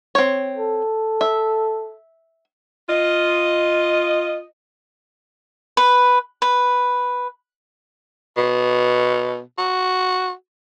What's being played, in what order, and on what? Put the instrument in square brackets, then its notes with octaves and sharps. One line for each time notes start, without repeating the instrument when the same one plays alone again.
[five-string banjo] C4 C#5
[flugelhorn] A4
[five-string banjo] E5
[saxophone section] F4 D#5
[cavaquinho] B4
B4
[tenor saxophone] B2
F#4